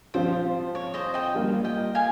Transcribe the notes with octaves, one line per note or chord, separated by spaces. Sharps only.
F3 C4 F4 C5
C#5
C5 D#5
D#5 G5
G3 A#3 F4
D#5 G5
F5 G#5